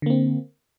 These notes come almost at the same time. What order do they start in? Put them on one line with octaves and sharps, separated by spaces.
D3 A#3 C4